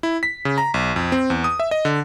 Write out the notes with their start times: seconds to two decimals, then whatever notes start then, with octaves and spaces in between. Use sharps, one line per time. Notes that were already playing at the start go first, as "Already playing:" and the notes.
0.03 E4
0.23 B6
0.45 C#3
0.58 A#5
0.74 B1
0.96 F2
1.12 C4
1.30 E2
1.44 D#6
1.60 E5
1.71 D#5
1.85 D3